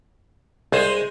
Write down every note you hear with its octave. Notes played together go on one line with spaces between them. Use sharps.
C2 G#3 G#4 C5